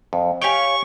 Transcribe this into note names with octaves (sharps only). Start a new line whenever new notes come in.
F2
G4 C#5 F5 G5 G#5 C#6